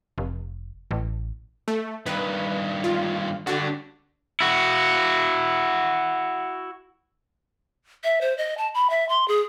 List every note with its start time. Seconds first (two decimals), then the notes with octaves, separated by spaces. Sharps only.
0.18 F1
0.91 A1
1.68 A3
2.06 G2 D#3 B4
2.84 F4
3.47 D3 D4 F#4 G4
4.40 E4 F#4
8.04 E5
8.21 C5
8.38 D#5
8.58 A5
8.74 B5
8.90 E5
9.09 C6
9.28 G#4